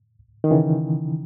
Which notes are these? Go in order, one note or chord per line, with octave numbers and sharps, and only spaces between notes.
D#3
C#3 E3